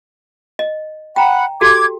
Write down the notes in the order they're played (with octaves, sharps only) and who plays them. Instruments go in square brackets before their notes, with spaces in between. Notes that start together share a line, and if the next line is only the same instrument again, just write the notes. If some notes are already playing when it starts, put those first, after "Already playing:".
[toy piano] D#5
[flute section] F#5 B5 [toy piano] G5 A#5
[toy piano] F#4 G4 A4 [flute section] D6 G#6